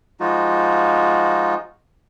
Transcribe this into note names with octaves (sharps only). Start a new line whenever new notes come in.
F3 G#3 D#4 F4 F#4